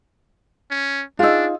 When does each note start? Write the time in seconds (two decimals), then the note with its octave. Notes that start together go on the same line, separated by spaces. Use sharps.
0.71 C#4
1.19 D4 D#4 F4 G#4 E6